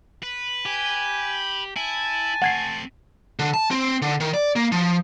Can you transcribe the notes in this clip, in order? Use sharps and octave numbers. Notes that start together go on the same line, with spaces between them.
B4
G4 G#5
E4 G#5 A5
A3 C4 F#5 G#6 C7
D3
A5
C4
D3
D#3
D5
A#3
F3